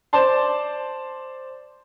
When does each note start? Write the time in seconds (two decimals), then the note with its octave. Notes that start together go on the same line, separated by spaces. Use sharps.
0.13 C5 D5 A5 C6